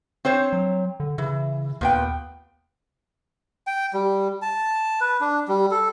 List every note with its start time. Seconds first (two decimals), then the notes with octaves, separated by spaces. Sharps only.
0.25 C4 C5 C#5
0.53 F#3
1.00 D3
1.18 C#3 E3
1.81 D#2 A#2 B3 G5
3.67 G5
3.93 G3
4.42 A5
5.01 B4
5.21 D4
5.48 G3
5.71 A4